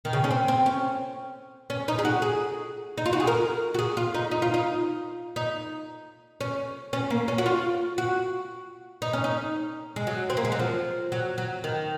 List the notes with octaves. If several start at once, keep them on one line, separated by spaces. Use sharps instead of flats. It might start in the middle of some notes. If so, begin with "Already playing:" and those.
D#3
C#3
C#4
C4
C4
C#4
C#4
D#4
G#4
F#4
G#4
D#4
F4
F#4
G#4
A#4
F#4
G#4
F4
D#4
D#4
F4
D#4
D#4
C#4
C#4
A#3
C#4
F#4
F4
F#4
D#4
C#4
D#4
G#3
F#3
C4
A#3
G#3
F#3
F3
F#3
F#3
D#3